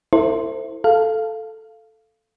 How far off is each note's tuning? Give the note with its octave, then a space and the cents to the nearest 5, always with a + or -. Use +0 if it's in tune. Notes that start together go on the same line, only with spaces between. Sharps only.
E4 +0 A4 +40 C5 +0
A4 +0 F5 -10